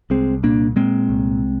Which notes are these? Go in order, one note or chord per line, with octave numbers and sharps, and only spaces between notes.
C2 G#3 C4
A#2 A#3 D4
A#2 G#3 C4
C2